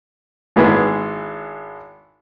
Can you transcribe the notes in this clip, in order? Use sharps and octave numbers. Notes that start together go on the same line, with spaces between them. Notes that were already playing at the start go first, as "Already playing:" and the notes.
G#1 G#2 B3 E4 G#4